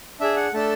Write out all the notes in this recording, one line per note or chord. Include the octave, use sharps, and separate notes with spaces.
D4 G#4 E5
F#5
A3 D4 A4 A5